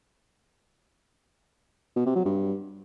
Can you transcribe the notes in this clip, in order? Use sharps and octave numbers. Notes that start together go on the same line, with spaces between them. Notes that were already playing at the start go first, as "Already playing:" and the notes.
B2
C3
F#3
G2